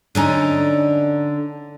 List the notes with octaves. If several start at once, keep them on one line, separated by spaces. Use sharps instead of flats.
D3 C#4 D#4